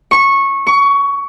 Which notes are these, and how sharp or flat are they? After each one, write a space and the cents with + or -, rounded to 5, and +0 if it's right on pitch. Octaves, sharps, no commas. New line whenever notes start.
C#6 -15
C#6 +20